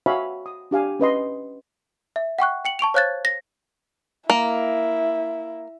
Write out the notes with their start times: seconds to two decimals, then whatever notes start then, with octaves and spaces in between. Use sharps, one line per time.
0.06 F#4 C#5 E5 F5 G#5 B5
0.46 D#6
0.71 D4 G4 F5 G#5
1.00 C#4 B4 D#5 C6
2.16 E5
2.39 F#5 G5 C#6 F#6
2.65 G5 C#7 F#7
2.79 A5 C#6 D7 F7
2.94 C5 C#5 F5 F#6 G#6 A6
3.25 A#6
4.30 A#3 E4